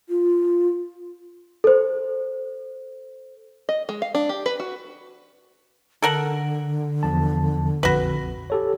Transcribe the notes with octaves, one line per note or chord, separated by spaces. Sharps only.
F4
A4 C5
D#5
G#3
F5
D4
G4
B4
F#4
D3 A4 A#4 F#5
E2 F3 A5
A#1 F2 F#4 B4
G4 A4 C#5